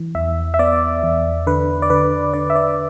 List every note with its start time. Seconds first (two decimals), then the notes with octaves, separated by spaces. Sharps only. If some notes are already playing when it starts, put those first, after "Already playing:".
Already playing: E3
0.15 E2 E5
0.54 E5
0.59 B3 D5
1.03 E2
1.47 D3 B4
1.82 D5
1.90 D3 B4
2.34 D3 D5
2.50 E5
2.55 D5